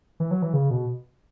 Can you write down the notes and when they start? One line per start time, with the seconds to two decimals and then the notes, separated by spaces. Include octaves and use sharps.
0.20 E3
0.31 F#3
0.42 E3
0.54 C#3
0.70 B2